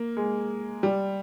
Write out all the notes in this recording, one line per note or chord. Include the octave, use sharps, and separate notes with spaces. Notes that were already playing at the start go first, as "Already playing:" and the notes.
Already playing: A#3
G#3
G3